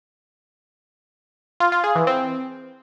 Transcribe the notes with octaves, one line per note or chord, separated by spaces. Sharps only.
F4
F4
G#4
E3
C4